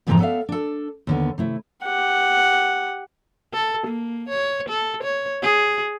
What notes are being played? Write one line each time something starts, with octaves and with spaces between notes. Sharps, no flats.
F2 G#2 C3 E3 C4 A#5
B3 A4 D5 E5 F5
D4 A4
D#2 D3 B3
C3 A3 E4
G4 F#5
A4
A#3
C#5
A4
C#5
G#4